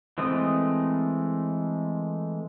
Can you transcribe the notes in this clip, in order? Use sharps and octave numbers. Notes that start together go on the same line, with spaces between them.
E3 G#3 A3 C4 D#6